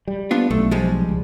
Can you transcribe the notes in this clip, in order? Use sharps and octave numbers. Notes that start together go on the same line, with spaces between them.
G3
B3 D4 F4
B1 A3
F3 G3 G#3
C#2